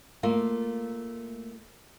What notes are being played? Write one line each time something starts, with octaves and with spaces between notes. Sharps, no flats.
A3 A#3 F4